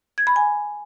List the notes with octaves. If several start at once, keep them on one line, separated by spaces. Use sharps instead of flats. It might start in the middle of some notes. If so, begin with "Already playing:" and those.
G#6
B5
G#5